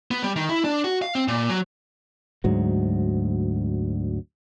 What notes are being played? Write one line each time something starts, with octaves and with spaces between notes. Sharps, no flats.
B3
G3
D#3
E4
D4
F#4
F5
C4
A#2
F#3
D2 G#2 F#3